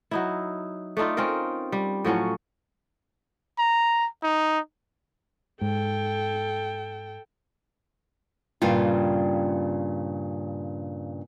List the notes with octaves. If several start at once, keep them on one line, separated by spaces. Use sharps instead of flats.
F#3 D#4 E4
A3 D4 D#4 F4
C4 C#4 F4 A#4
G3
A2 F3 F#3 C#4
A#5
D#4
G#2 A4 G5
G2 A#2 C#3 G3 F4